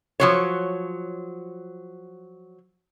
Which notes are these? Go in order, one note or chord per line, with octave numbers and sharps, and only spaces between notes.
F3 F#3 C#5